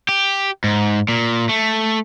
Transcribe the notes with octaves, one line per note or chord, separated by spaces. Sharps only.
G4
G#2
A#2
A3